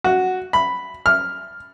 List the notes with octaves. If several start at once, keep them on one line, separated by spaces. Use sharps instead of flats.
F#4
B5
F6